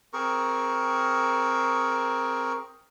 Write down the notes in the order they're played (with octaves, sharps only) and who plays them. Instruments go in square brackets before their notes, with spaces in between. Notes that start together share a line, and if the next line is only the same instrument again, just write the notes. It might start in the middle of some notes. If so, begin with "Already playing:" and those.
[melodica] C4 G#4 A#4 C#6